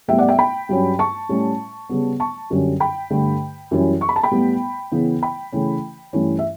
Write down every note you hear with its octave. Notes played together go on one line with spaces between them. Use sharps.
A2 G3 B3 E5 G5
D5 F#5
E5 G5
G5 B5
G2 F#3 C#4
A5 C#6
A2 G3 C#4
C#3 G3 B3
A5 C#6
F#2 D3 G3 C#4
G5 B5
G2 D3 A3
F#2 E3 G3 C#4
C#6
B5
A5
G5 B5
A2 G3 B3
C#3 E3 B3
G5 B5
C#3 E3 A3 C#4
G2 E3 A3 C#4
E5